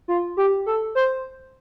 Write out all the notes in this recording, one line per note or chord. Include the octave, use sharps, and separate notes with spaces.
F4
G4
A4
C5